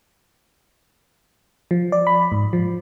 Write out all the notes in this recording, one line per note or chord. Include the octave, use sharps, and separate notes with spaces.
F3
D5
B5
G#2
F3